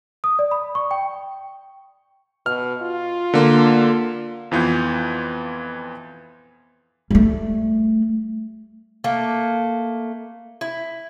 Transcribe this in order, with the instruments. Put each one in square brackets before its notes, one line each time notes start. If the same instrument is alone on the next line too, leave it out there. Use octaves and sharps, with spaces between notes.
[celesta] D#6
D5
B5
C#6
G5
[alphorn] B2 [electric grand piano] F6
[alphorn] F4
[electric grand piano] D3 A#3
F2 E3 B3 F4 G6
[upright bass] G3 A3
[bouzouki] A3 A#3
E4